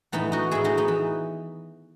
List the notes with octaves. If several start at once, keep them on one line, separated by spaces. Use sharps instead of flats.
A2 E3 B3 D#4
D#4 F#4
A2 E3 E4 G#4
D#4 F#4
B3 D#4
E3